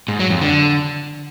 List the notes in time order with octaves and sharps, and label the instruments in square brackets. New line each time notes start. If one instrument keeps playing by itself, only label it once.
[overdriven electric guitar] G#2
F#3
F2
D3